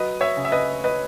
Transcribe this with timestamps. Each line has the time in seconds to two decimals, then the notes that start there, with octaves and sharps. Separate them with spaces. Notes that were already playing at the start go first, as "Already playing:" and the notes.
Already playing: F#3 B4 D#5
0.21 C#5 E5
0.37 C#3
0.45 E5
0.52 B4 D#5
0.84 B4 D#5